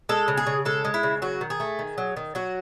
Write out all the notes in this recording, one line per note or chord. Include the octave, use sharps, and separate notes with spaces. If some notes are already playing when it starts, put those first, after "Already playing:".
G#3 A4
C#3
G#4
C#3
G#3 A4
G#3
E4
C#3
F#3 F#4
D#3
G#4
A3
D#3
F#3
D#3
F#3 F#4